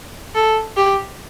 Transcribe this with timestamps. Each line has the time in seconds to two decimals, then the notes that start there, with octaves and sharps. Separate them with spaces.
0.35 A4
0.77 G4